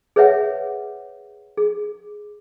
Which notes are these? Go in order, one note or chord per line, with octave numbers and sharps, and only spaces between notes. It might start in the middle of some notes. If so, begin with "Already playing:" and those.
G#4 B4 C#5 E5 F#5
G#4